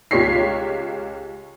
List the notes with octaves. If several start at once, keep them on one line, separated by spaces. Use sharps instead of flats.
C#2 F4 G4 C#5 B6 C7